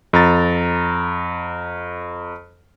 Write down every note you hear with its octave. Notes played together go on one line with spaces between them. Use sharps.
F2 A#5 A6